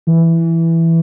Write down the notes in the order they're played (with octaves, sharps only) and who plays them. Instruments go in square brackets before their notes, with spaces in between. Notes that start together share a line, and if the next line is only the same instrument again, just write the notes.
[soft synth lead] E3